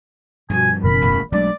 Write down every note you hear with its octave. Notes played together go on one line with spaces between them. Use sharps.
G2 B2 F3 G#5
F#1 B2 E3 C#4 A#4 B5
D#1 A1 E2
B1 F#3 G#3 A3 D4 D5